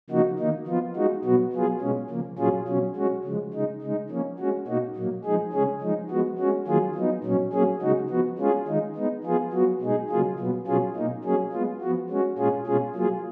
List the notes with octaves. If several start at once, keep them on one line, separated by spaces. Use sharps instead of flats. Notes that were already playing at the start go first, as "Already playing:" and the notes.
C#3 F3 A#3 D#4 F#4
D#3 A#3 D#4
F3 B3 F4
G#3 D#4 F#4
B2 F#3 B3 F#4
F#3 B3 F4 G#4
B2 G#3 C#4
C#3 F3 A#3
A#2 F#3 C#4 F4 G#4
B2 F#3 C#4
G#3 C#4 F#4
C#3 F3 G#3
C#3 G#3 D#4
C#3 G#3 D#4
F3 A#3 C#4
G#3 C#4 F#4
B2 A#3 D#4 F#4
A#2 F#3 A#3
F3 G#3 D#4 G#4
C#3 G#3 C#4 G#4
F3 G#3 D#4
F3 G#3 B3 F#4
G#3 C#4 F#4
D#3 F#3 A#3 F4 G#4
F#3 B3 D#4
A#2 F#3 C#4
F#3 A#3 C#4 G#4
C#3 G#3 D#4 F#4
F3 B3 F#4
G#3 C#4 F4 G#4
D#3 G#3 D#4
G#3 B3 D#4
F3 B3 F4 G#4
F#3 B3 F#4
B2 G#3 D#4 G#4
C#3 F#3 A#3 F4 G#4
B2 F#3 B3
B2 F#3 C#4 F4 G#4
B2 A#3 D#4
F#3 A#3 C#4 G#4
G#3 B3 F4
F3 B3 F#4
G#3 C#4 F#4
A#2 G#3 C#4 F4 G#4
B2 G#3 C#4 F4 G#4
F#3 A#3 F4 G#4